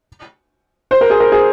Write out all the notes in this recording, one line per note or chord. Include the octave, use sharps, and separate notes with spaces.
C5
A#4
G#4
A#4
G#4